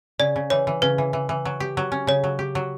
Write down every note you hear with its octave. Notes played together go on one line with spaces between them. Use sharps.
C#3 D5
C#3
E3 C#5
E3
C#3 B4
E3
E3
E3
F#3
G4
F#3
C#4
C#3 C#5
F#3
G4
F#3